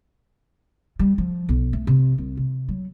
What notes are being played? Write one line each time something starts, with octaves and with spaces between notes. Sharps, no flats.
G3
F3
B1
A3
C3
C2
C3
F#3